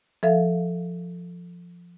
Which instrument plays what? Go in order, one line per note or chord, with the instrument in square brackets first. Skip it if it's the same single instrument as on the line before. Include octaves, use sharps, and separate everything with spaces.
[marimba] F3 A4 E5 F5